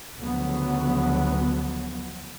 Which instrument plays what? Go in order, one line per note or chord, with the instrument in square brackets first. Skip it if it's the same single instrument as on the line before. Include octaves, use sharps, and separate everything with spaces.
[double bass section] D2 C#3 F3 F#3 B3